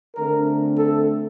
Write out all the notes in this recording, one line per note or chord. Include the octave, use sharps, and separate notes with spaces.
D3 A3 C4 A#4
A4